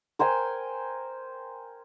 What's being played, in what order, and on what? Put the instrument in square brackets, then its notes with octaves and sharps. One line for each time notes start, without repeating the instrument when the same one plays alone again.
[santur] A#4 C5 G5 G#5